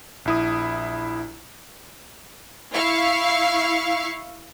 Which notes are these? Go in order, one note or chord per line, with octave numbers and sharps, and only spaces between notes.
A#1 E4 D#6
E4 F5 C#6